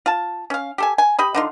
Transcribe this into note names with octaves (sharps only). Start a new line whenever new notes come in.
F4 A5
C#4 F5
G4 A4 G#5
G#5
G4 D#5 B5
D3 D#4 F4